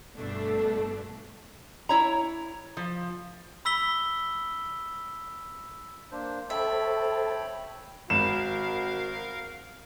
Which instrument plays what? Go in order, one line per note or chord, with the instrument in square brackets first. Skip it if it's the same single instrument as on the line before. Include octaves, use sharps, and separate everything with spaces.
[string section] G1 G2 B2 A3 D4
[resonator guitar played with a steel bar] E4 C#5 A#5
F3
[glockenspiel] B5 E6 B6 G7
[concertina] A#3 D4 C5
[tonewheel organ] A4 C5 A5 [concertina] C#5 G5 B5 [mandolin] E5
[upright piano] G#1 [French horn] F#4 [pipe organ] A#4 F5 [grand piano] E7